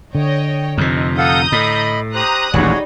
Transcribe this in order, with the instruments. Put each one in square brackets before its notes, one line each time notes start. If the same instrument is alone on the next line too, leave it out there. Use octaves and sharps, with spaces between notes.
[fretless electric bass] D3 [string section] C#5 D#5 G5
[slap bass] F2 C3 [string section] D#4
[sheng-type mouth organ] A4 F5 F#5 [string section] A#5 D#6 G6
[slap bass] A2 [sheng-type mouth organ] D#5 B5
[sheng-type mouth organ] G4 C5 [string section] A#5 D#6 F#6
[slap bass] D#1 A1 F2 [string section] G3 D#4 [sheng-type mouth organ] F#4 G#4 C#5